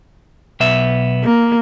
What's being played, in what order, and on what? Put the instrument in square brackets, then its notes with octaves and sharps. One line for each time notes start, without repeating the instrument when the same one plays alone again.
[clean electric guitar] B1 B3 E5
[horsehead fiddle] A#3